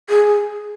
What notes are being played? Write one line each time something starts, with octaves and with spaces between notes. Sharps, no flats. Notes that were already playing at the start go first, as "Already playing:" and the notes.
G#4